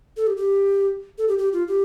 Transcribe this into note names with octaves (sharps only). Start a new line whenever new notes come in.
A4
G4
G4
A4
G4
G4
F4
G4